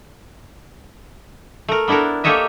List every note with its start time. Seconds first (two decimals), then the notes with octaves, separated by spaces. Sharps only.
1.68 A3 A#4
1.88 B3 D4 E4 A4 A#4
2.24 A#3 G4 A4 C#5 D#5 E5